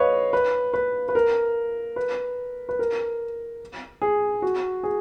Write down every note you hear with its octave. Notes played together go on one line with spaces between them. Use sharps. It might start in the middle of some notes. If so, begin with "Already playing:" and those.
Already playing: B4 C#5 D#5 F5
B4
B4
B4
A#4
B4
B4
A#4
G#4
F#4
G#4